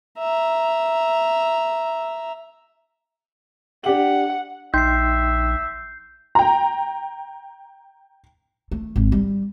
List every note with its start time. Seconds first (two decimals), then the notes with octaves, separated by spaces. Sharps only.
0.19 E5 A#5
3.84 D4 G4 F#5 F#7
4.74 A#1 D#4 E5 G5 C6 G6 C7
6.35 G5 A#5
8.71 A3
8.96 G#1
9.12 G3